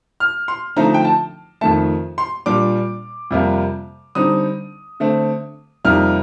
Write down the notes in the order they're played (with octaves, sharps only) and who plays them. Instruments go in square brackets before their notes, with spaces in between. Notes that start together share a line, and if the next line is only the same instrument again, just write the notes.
[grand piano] F6
C6
D3 F3 A3 C4 D#4 A#5
G5
A5
F2 D#3 A3 A5
C6
A#2 G3 D4 D6
F2 C3 G3 A#3
D3 G3 C4 D#4 D#6
D3 A3 C4
F2 C3 G3 A#3 D#4 F6